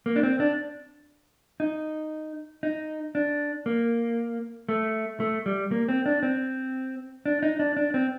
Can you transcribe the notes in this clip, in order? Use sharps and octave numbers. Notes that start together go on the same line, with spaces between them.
A#3
D4
C4
D4
D#4
D#4
D4
A#3
A3
A3
G3
A#3
C4
D4
C4
D4
D#4
D4
D4
C4